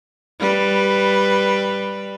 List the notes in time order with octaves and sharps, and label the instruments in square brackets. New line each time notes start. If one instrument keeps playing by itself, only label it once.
[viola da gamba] G3 B4